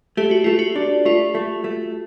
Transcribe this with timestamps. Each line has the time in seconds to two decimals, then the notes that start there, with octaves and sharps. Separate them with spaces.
0.17 A3 G4
0.31 F#4
0.44 A3 F4
0.59 F#4
0.76 D4
1.05 A3 F4
1.35 A3
1.64 A3